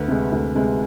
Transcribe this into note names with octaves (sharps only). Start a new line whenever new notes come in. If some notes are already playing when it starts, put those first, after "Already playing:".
Already playing: D2 B4
C3 G#3
D2
C3 G#3